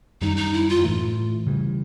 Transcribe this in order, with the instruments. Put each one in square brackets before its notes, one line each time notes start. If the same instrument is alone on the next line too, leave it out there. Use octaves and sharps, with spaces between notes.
[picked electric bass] F#2 D#3 G3 [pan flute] D#4
[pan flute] D#4
E4
F4
[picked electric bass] A2 E3 A3
C#3 E3 G3